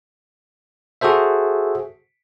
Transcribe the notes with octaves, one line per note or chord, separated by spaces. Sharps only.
F#4 G#4 A4 C5 E5